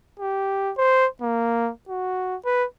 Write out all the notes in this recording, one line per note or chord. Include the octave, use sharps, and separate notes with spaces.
G4
C5
A#3
F#4
B4